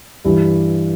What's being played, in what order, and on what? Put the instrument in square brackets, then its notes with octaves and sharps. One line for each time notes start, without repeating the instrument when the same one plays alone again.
[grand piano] G2 E3 G3 E4 G4